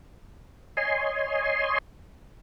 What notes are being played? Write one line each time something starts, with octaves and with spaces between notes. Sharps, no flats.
C#5 D#5 G#5 C6